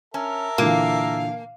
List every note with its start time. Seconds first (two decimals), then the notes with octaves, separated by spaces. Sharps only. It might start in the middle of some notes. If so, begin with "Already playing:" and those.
0.14 C#4 A#4 E5 A5
0.58 A#2 D3 E3 A#3 F5